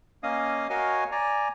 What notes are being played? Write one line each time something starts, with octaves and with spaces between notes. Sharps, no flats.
A#3 C#4 D#5 F5 D#6
F#4 A#4 C#5 D#5 F5 G#5
D5 G#5 A#5